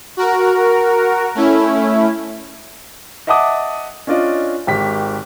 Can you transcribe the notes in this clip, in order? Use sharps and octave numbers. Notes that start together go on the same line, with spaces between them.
F#4 A#4
A3 C#4 E4
D#5 E5 F#5 A5 D6 D#6
C#4 D4 F4 D5 D#5
G#1 D#3 G4 B6